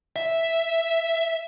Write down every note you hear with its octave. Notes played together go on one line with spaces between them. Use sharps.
E5